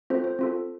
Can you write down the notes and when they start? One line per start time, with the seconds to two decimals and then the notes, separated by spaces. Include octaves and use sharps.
0.10 C4 F4 A4 C5
0.24 C5
0.39 C4 F4 A4